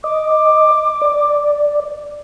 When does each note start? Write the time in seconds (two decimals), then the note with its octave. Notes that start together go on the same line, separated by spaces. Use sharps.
0.04 D#5 D6
1.02 D5